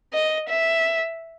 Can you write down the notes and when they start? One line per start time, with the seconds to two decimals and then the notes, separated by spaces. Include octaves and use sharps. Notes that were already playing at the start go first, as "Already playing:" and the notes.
0.13 D#5
0.49 E5